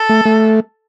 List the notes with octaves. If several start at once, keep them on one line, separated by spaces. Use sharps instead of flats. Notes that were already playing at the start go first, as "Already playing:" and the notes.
Already playing: A4
A3
A3